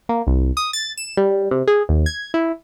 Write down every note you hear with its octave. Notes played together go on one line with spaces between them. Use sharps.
A#3
C2
D#6
A6
E7
G3
C3
G#4
D#2
G#6
E4